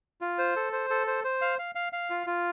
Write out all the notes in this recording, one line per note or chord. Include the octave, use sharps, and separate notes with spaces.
F4
C5
A4
C5
A4
C5
C5
F5
F5
F5
F5
F4
F4